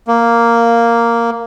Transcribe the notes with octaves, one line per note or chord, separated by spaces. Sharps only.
A#3